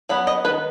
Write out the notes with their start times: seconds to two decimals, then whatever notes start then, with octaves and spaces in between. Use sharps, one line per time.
0.09 F#3 B3 B5
0.27 D#5
0.45 D#3 B4